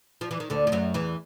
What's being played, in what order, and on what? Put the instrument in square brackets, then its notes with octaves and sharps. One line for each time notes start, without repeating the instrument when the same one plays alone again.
[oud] F3
E3
D#3
D2 D3
F3
F#2 F#3
E2 E3